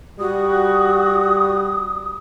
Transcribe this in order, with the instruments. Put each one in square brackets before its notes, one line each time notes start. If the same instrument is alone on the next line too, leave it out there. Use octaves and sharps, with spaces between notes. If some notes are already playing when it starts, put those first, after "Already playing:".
[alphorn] G3 [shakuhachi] F#4 [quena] D#6